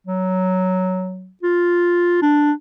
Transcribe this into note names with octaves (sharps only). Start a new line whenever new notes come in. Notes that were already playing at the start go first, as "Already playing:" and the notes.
F#3
F4
D4